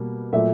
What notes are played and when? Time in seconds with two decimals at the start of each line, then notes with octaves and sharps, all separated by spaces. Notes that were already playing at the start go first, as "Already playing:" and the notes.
Already playing: B2 G3 A#3
0.33 A#2 F#3 A3 E5